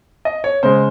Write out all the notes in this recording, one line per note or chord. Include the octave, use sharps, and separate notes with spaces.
D#5
C#5
C#3 G#3 C5